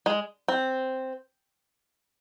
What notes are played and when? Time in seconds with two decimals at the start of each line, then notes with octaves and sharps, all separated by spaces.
0.06 G#3
0.48 C4